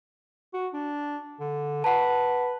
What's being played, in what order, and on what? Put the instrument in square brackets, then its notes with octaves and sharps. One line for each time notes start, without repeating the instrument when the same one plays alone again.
[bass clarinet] F#4
D4
D3
[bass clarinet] B4 [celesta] F#5 A5